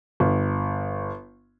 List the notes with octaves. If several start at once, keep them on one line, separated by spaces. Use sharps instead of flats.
G1